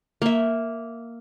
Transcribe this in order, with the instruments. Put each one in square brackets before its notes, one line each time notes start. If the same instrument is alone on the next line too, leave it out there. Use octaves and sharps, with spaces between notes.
[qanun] A#3 E5